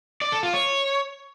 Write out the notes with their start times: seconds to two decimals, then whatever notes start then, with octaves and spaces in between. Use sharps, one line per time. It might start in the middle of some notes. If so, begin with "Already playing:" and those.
0.21 D5
0.32 A4
0.43 F4
0.54 C#5